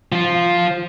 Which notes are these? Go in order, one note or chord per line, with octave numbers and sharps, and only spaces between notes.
F3 F4